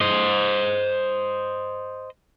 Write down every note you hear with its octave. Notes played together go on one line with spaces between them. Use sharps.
C5 D#5